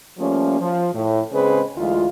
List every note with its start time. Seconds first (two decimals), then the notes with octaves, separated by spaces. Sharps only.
0.19 F3 G3 A3 A#3 C#4
0.60 F3
0.94 A2
1.32 C#3 G#3 C4 B4 C5
1.77 D2 E3 G#3 F4